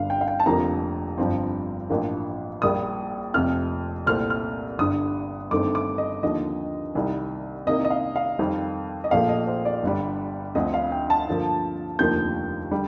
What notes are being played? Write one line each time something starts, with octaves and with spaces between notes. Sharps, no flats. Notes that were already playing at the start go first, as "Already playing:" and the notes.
Already playing: G1 G2 D3 F5
G5
F5
G5
A5
F1 F2 D3 F3 A#3 A#5
G1 G2 F3 C4
A1 G2 F3 A#3
A#1 A#2 G3 A#3 D#6
F1 F2 C3 F3 C4 F6
C2 A#2 A3 C4 F6
F6
G1 G2 D3 D#6
G1 G2 D#3 A3 C4 D6
D6
D#5
D#2 D3 F3 D#5
C2 C3 D#3 G3
C2 C3 D#3 A#3 D#5
D#5
F5
F5
F2 D#3 G3 C4
D#5
A#1 A#2 F3 A3 F5
D#5
C5
D5
G1 G2 D3 G3
D2 D3 F3 C4 D#5
F5
G5
A5
G2 D3 F3 A#3
F1 D#2 D3 F3 A#3 G6
D3 G3